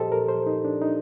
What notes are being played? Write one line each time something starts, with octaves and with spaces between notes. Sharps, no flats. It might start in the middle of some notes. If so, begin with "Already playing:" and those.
Already playing: A#2 F3 G4 A4 C5 D#5
A#4
C5
D#4
D4
D#4